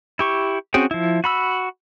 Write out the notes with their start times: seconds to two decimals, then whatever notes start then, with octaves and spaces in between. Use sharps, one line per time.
0.19 E4 G4 C#6
0.74 C4 C#4 F#4 G#4 G5
0.91 F3 E4
1.24 F#4 B5 E6